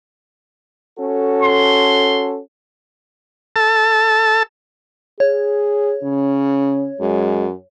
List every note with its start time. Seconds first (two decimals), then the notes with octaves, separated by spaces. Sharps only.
0.99 C#4 F#4 A4
1.42 C6
3.56 A4 A5
5.20 G#4 C#5
6.03 C#3 C#4
7.00 F#2 G#3